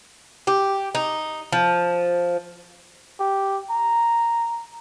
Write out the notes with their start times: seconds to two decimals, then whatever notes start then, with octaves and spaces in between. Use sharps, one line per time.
0.47 G4
0.95 D#4
1.52 F3
3.20 G4
3.70 A#5